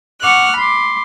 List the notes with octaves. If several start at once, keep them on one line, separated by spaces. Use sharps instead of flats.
F#5 C#6 D6 F6 F#6
B5 C6 D6